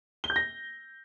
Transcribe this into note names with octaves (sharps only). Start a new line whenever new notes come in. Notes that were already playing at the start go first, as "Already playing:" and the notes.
G7
G6
A#6